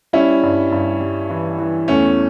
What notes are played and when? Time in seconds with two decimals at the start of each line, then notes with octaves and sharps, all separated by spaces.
0.13 G3 C#4 E4
0.43 G2
0.72 G2
1.01 G3
1.30 E3
1.59 E3
1.88 E2 A3 C#4